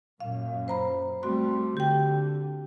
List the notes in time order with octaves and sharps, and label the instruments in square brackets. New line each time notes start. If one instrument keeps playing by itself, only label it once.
[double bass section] F#2 A#2 [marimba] F5
[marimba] C5 A#5 B5
[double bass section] G3 A3 [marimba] C4 F#4 C6
[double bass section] D3 [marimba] G4 G5